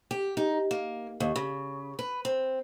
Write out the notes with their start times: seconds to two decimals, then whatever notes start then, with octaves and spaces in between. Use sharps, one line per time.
0.11 G4
0.37 D#4
0.71 A#3
1.20 D#2
1.36 C#3
1.99 B4
2.25 C4